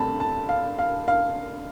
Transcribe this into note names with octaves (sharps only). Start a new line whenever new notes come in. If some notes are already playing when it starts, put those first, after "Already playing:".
Already playing: G2 D3 A3 C4 A5 B5
A5
F5
F5
F5